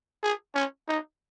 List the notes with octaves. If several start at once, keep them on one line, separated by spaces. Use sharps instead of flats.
G#4
C#4
D#4